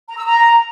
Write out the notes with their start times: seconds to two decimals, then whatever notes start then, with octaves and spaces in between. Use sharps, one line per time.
0.07 A#5
0.16 E6
0.25 A#5